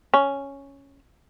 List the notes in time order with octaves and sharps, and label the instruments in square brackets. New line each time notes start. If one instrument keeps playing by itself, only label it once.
[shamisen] C#4